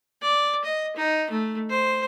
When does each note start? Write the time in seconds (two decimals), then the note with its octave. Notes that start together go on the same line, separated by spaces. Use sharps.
0.22 D5
0.64 D#5
0.96 D#4
1.30 A3
1.70 C5